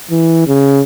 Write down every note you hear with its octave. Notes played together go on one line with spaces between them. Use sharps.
E3
C#3